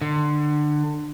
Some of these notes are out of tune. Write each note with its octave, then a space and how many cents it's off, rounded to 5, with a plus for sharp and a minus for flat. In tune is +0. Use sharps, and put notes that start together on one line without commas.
D3 +25